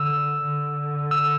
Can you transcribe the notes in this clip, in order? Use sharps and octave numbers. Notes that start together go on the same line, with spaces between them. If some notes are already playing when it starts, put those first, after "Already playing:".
Already playing: D3 E6
D3
E6